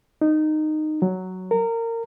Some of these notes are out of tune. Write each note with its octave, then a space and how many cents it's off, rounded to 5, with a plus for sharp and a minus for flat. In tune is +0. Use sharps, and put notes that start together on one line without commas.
D#4 -15
F#3 +5
A#4 -25